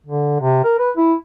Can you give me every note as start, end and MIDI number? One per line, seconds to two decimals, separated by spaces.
0.06 0.35 50
0.40 0.61 48
0.64 0.75 70
0.79 0.91 71
0.97 1.14 64